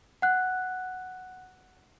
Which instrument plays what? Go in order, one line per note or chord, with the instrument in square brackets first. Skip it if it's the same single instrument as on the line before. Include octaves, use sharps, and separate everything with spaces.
[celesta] F#5 F#6